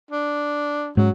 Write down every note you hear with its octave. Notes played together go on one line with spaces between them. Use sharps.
D4
G#2 F#3 G#3 C#4